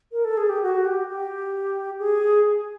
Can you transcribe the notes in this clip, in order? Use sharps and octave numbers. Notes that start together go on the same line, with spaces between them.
A#4
A4
G#4
G4
F#4
G4
G4
G#4